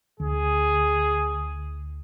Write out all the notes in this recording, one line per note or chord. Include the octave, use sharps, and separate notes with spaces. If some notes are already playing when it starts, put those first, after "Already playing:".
D2 G#4